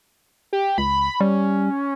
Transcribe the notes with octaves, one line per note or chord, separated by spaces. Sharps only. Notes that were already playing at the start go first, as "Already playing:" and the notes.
G4
C#2 B5
G3 C#4